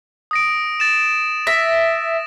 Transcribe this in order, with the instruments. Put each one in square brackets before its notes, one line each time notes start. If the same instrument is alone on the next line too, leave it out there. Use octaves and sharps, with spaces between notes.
[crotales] D#6 A#6 D7
A6 E7
[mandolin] E5 [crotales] A#6